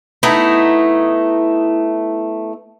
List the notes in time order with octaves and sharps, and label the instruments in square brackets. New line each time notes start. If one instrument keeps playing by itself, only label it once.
[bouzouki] A3 B3 D#4 E4